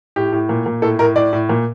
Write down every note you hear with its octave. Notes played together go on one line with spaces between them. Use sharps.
A2 G4
A2
A#2
A#2
A2 A4
A2 A#4
A2 D5
A2
A#2